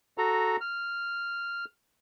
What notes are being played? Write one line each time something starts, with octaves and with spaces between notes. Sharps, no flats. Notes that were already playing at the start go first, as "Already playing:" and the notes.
F#4 A4 A#5
F6